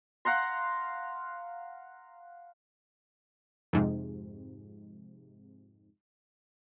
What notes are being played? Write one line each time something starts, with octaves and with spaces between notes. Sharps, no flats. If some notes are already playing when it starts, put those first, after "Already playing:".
F5 F#5 A#5 C6
F2 G#2 C3